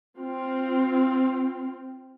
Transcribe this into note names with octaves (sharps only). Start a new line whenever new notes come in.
C4 F4